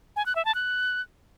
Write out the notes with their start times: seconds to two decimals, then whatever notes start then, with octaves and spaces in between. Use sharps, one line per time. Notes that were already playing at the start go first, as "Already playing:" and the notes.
0.16 G#5
0.26 F#6
0.35 E5
0.45 A5
0.55 F#6